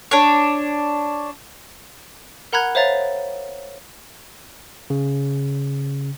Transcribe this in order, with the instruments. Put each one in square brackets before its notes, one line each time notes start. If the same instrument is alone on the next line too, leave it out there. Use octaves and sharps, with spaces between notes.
[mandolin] D4 C#5
[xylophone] A#4 F#5 A#5 B5 F#6 G#6
C5 C#5 E5 F5 A#5 A6
[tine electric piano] C#3